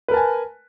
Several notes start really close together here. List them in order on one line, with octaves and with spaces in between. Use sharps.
B4 A#4 A5 G#5